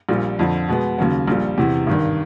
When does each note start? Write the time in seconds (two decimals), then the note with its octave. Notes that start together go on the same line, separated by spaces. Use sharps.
0.09 A#1 A#2 G3
0.39 F2 D3 F3
0.68 B2 G#3 B3
0.98 D#2 C#3 F#3
1.27 A#1 A#2 G3
1.58 E2 C3 E3
1.87 G#1 G2 D#3